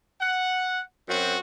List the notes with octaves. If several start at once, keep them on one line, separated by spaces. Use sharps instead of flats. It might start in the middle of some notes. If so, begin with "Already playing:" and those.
F#5
F#2 C4 F#4